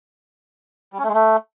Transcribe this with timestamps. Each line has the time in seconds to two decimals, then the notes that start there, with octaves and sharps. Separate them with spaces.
0.93 G3
0.98 C#4
1.03 A3
1.09 G#3
1.14 A3